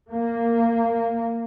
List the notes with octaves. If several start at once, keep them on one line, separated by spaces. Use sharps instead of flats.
A#3